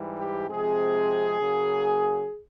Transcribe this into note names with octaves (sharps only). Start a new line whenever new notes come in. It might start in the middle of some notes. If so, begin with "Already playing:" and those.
Already playing: G#2 E3 G3
G4
C3 F3 G#3 C4 G#4
C#3 F#3 A#3